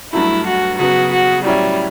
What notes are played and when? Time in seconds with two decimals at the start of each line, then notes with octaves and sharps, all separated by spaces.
0.13 G2 F#3 A3 E4
0.46 F#4
0.79 C#3 F#3 B3 F#4
1.12 F#4
1.45 A2 F#3 G3 C#4 E4